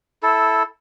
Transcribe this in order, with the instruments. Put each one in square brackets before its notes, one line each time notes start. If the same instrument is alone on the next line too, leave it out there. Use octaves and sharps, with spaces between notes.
[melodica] E4 A4